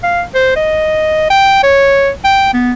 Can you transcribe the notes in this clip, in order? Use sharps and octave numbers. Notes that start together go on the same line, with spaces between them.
F5
C5
D#5
G5
C#5
G5
B3